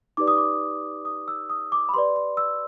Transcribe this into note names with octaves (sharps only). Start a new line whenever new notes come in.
D#4 G4 B4 D5 D6
D#6
D6
D#6
E6
D#6
D6
B5
G4 B4 D5 C6
C6
E6